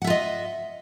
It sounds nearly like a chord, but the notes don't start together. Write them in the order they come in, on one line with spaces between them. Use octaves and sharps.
F#5 E5 F4 D#5